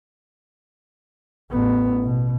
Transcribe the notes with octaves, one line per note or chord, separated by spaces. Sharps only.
A1 B3
B2